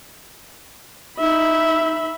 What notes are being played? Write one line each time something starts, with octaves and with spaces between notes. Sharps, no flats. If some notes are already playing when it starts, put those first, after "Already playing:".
D#4 E5 B5